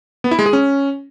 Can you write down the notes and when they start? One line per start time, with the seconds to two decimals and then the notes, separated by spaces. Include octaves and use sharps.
0.24 B3
0.31 E4
0.39 G#3
0.46 G#4
0.53 C#4